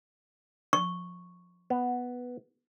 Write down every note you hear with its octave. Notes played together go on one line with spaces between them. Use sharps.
C#6
B3